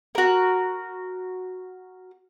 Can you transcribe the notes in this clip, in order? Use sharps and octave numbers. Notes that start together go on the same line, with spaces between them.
F#4 A#4